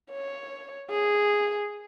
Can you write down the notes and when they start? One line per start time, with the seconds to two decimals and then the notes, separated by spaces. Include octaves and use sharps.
0.11 C#5
0.90 G#4